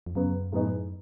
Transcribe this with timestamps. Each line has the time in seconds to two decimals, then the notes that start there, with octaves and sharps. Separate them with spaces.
0.06 F2
0.15 F#2 C#3 F#3 B3
0.52 A2 F#3 B3 D#4 G#4